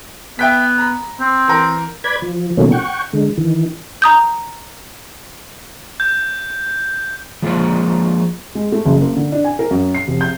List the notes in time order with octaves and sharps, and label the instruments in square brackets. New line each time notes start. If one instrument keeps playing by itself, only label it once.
[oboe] B3 [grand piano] E5 G5 B6
[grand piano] A#5 B5
[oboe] C4
[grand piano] E3 A#4
[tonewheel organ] B4 D5 B5 G#6
F3
B2 D#3 F#3 A3 A#3 C#4
F#5 G5 C#6
D3 G#3
D#3 E3
[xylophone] A#5 D#6 G6
[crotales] G6
[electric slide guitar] F3 G#3 A#3 F4 C5
[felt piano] G#3
A3
F#1
A#3
D3
D4
G#5
A#4
F#2
C7
F1
G6